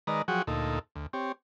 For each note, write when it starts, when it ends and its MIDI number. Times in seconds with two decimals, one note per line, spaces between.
0.07 0.22 51
0.07 0.22 56
0.07 0.22 71
0.07 0.22 74
0.07 0.22 75
0.07 0.22 82
0.28 0.42 53
0.28 0.42 54
0.28 0.42 66
0.28 0.42 68
0.28 0.42 78
0.28 0.42 79
0.47 0.79 38
0.47 0.79 46
0.47 0.79 63
0.47 0.79 69
0.96 1.06 38
1.13 1.32 60
1.13 1.32 67
1.13 1.32 73